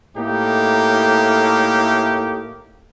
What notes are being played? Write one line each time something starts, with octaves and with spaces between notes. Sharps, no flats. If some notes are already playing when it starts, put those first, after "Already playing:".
A2 A3 A#3 D#4 G4